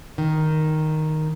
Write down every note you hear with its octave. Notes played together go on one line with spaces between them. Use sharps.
D#3